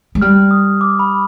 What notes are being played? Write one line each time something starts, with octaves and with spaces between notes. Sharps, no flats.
G#3
G3 F6
D#6
D6
B5